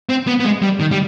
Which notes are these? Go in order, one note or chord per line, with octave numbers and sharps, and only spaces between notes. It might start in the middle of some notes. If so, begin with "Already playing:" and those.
C4
B3
B3
G#3
G3
D#3
G3